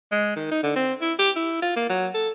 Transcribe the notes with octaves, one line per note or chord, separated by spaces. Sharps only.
G#3
D#3
D#4
D3
C4
E4
G4
E4
F4
A#3
F#3
A4